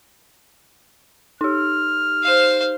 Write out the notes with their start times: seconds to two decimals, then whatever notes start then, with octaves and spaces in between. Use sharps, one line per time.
1.41 D#4 G4 F6
2.24 C5 F5